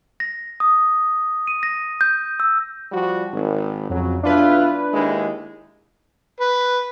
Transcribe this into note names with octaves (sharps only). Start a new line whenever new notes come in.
A#6
D#6
D#7
A#6
G6
E6
F3 G3 F#4
G#1
F2 C#3 F#3
B1 D4 E4 F4 B4
D#2 G#3 E4
B4